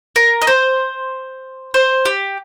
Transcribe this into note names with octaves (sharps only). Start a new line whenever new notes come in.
A#4
D#5
C5
C5
G4